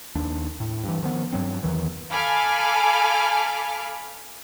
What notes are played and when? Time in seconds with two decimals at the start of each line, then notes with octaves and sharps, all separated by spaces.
0.15 D#2 D4
0.60 A2
0.84 G2 E3
1.03 D#3 F3 B3
1.33 G2 F#3 C4
1.63 E2 G#2 D#3 E3
2.11 A4 F5 G#5 B5 D6 F6